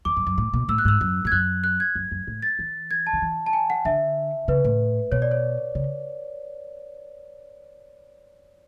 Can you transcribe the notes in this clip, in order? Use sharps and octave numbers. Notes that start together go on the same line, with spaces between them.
E2 D6
F#2
F#2
A2
B2
A2 E6
F#6
G#2 E6
F#2
G#2 G#6
F#2 F#6
F#6
G#6
F#2
F#2
A2
A6
E3
G#6
A5
D3
E3
A5
G#5
F#5
D3 E5
C#3 B4
A2
B2 C#5
D5
C#5
C#3